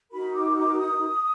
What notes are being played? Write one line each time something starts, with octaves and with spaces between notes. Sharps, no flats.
D#4 F#4 A#4 B5
D6
D6
D#6